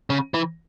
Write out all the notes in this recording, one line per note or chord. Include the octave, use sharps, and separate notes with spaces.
C#3
E3